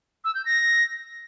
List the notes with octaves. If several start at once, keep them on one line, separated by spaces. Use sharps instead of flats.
E6
G6
A#6